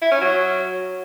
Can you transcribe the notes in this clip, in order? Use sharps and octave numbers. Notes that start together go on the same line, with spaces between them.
E4
C#4
F#3